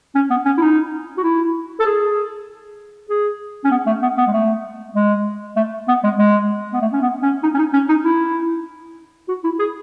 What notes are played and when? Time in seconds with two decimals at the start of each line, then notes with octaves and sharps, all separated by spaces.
0.15 C#4
0.30 B3
0.45 C#4
0.57 E4
0.61 D#4
1.18 F#4
1.23 E4
1.80 A4
1.85 G#4
3.09 G#4
3.64 C#4
3.71 B3
3.86 A3
4.02 B3
4.18 B3
4.27 G#3
4.33 A3
4.95 G#3
5.57 A3
5.88 B3
6.04 G#3
6.18 G#3
6.73 B3
6.81 A3
6.93 C#4
7.01 B3
7.22 C#4
7.43 D#4
7.54 C#4
7.58 D#4
7.73 C#4
7.89 D#4
8.04 E4
9.28 F#4
9.44 E4
9.59 G#4